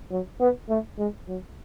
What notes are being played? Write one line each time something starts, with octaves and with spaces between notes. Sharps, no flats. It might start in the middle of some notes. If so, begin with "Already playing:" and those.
F#3
B3
A3
G#3
F#3